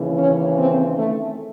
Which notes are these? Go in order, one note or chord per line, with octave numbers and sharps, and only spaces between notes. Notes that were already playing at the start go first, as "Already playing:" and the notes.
Already playing: D#2 C#3 E3
C#4
C4
A3